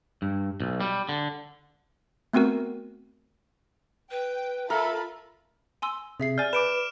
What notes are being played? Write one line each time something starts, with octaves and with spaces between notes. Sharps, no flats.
G2
B1
G3
D3
A3 B3 C4 F#4 A#4
B4 G5
F4 A4 A#4 E5 A5 B5
G#5 C6 E6
C3 G#4 E5 C7
D5 G#5 F6 G6 A6
B4 D6 D7 E7